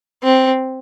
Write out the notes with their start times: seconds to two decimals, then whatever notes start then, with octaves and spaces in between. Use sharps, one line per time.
0.24 C4